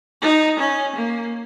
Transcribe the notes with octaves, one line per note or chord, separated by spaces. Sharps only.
D#4
C#4
A#3